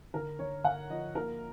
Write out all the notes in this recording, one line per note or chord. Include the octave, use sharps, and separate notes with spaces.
D3 A#4
D3 C#5
D3 F#5
F3 D#5
A#3 A#4